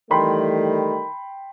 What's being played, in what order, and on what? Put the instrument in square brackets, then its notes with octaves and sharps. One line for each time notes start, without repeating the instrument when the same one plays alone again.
[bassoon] D#3 [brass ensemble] E3 G3 A3 [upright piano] G5 B5 C6